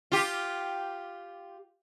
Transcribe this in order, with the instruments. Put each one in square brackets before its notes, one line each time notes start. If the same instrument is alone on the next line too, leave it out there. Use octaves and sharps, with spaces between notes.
[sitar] F4 G4